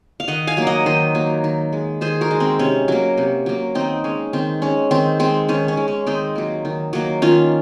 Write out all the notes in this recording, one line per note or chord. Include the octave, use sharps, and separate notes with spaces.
F5
D#3 D#5 F#5
F5 G#5
F#3 A#3
D#5 F#5
D#3 C5 D#5
F#3 A#3
D#3
G#3
D#3 G#4 C5
F#4 A#4
G#3
C4
C3 C#4
F#3 A#3
C3
F#3 A#3
D#3 C4 D#4
G#3 C#4
D#3 C4
G#3 C#4
D#3 C4
G#3 C4
D#3 C#4
C#4
G#3
C#4
D#3 C4 D#4
F#3 A#3
D#3
F#3 A#3
D#3 C#4 F4